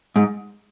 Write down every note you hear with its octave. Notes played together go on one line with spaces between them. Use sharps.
G#2